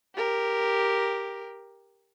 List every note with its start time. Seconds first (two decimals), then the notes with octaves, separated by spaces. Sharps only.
0.15 G4 A#4